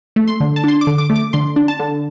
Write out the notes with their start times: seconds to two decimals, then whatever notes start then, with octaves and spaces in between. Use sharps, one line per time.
0.16 A3
0.27 C6
0.40 D3
0.56 A5
0.64 D4 C6
0.81 D6
0.87 D3
0.98 D6
1.10 A3
1.16 D6
1.33 D3 C6
1.56 D4
1.68 A5
1.80 D3